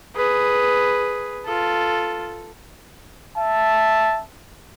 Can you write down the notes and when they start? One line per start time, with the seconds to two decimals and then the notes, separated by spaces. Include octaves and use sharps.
0.15 G#4 B4
1.45 F4 A4
3.38 E5 A5